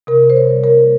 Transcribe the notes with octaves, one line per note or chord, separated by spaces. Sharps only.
C3 A#4
C3 C5
C#5
G3
A#4
A#3